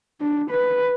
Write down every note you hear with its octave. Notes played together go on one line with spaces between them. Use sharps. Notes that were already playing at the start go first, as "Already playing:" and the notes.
D4
B4